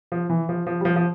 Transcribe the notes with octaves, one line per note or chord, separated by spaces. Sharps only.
F3
E3
F3
F3
G3
F3
F3